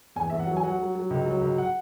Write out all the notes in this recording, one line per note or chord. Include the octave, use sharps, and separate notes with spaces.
E2 G#5
E2 E5
F#5
F#3
G#5
F#3 F#5
F#3
F#3
C#2
F#3
C#2
F#5